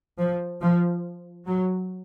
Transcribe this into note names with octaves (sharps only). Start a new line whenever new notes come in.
F3
F3
F#3